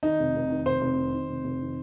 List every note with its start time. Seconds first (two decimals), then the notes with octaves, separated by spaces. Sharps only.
0.03 D#3 D#4
0.19 F1
0.35 F1
0.50 D#3
0.65 F1 C5
0.81 F1
0.97 D#3
1.13 D#3
1.29 F1
1.44 F1
1.61 D#3